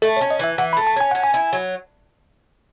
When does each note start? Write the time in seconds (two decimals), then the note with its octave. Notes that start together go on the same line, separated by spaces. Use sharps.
0.02 A3 A4
0.17 C#5
0.21 C#4
0.31 D#5
0.39 E3 E5
0.58 E3 F#5
0.73 B5
0.77 A3
0.87 A5
0.96 C#4 G#5
1.11 C#4 F#5
1.24 G#5
1.34 E4
1.53 F#3